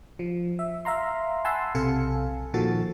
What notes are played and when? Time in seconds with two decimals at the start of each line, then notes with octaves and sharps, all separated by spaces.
0.19 F3
0.59 E5
0.85 E5 F5 A#5 C6
1.45 F#5 G#5 A5 B5 C6 E6
1.75 B1 C3 A4 F5 G#5 C#7
2.54 A#2 D#3 F3 F#4 A4 A6